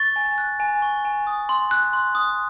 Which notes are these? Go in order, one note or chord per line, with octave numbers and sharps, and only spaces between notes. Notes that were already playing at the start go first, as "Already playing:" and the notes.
Already playing: C#6 A6
G#5
F#6
G#5
C#6
G#5
D#6
C6
F#6
C6
D#6